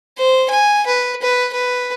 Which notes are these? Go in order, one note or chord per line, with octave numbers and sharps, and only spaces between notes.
C5
G#5
B4
B4
B4